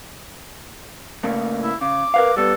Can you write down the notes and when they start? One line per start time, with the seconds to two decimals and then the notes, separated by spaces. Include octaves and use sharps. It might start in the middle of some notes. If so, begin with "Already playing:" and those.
1.24 C#3 A3 A#3
1.63 E4
1.81 C#3 D6
2.14 A#4 B4 F5
2.37 G3 B3 A4